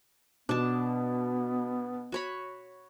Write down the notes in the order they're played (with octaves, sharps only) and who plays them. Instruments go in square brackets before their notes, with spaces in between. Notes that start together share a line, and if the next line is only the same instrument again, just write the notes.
[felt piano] B2 [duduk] B3 [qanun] D4 A5
[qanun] F#4 C#5 B5